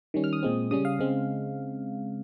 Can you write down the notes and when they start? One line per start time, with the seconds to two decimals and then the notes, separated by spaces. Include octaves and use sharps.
0.14 D#3 G3 C#4
0.24 F6
0.33 D#6
0.43 A#2 G#3 C4
0.71 C#3 G3 C#4 D#6
0.85 F5
0.99 C#3 G#3 C4